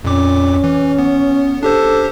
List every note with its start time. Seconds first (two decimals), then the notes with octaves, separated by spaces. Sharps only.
0.04 F2 A#2 C#4 D6
0.64 E3
0.99 B3
1.63 D4 G4 A4 C5